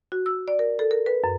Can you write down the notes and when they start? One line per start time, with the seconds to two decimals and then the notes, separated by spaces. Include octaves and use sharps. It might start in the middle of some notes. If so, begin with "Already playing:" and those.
0.12 F#4
0.26 E6
0.48 D5
0.59 A#4
0.79 A4
0.91 A#4
1.06 B4
1.24 F#2